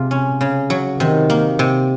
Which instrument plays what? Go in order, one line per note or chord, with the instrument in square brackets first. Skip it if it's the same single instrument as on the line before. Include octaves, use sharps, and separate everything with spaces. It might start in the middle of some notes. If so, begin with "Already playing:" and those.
Already playing: [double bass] C3 [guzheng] G#3 F4
[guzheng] C#4
C#3
F#3
[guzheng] C3 [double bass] D#3
[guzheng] A#3
C3